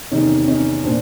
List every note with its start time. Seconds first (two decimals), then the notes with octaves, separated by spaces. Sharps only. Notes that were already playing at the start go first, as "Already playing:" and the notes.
0.11 E2 C3 D#3 C#4 D#4
0.48 C#4 D#4
0.84 A#2 C4 D4